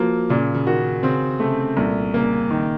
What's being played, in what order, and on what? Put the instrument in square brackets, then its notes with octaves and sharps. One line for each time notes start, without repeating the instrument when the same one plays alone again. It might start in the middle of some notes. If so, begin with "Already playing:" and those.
Already playing: [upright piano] F3 F#3 [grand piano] A#3
[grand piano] A#2 [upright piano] C#3
[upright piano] C#3
[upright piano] D#3 [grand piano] F#4
[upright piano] C#3 [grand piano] C4
[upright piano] C3 [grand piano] A3
[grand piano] C2 [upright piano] A#2
[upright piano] C#3 [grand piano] A#3
[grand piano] D#3